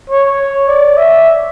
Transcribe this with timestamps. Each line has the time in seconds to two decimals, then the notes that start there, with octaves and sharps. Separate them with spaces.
0.10 C#5
0.68 D5
0.98 E5